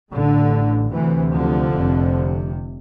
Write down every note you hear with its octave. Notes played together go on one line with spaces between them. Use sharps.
A1 A2 D3
D2 C3 E3
D3 F3
F1 F2 C3